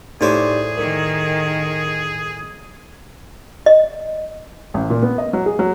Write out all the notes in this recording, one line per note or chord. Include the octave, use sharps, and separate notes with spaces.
A2 D#4 G4 G#4 C5 D5 D6
D#3 A#4
D#5
A1
A#2
B3
D#5
F#3
G#4
F#3